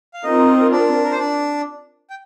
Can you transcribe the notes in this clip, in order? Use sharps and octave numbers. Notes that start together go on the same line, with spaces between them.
F5
C4 D#4 F4 A#4 D#5
D4 D5
A#4
C5
D4 D5
G5